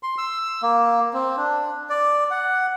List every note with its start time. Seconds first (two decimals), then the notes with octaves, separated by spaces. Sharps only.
0.03 C6
0.18 E6
0.62 A#3
1.13 C4
1.37 D4
1.89 D5
2.30 F#5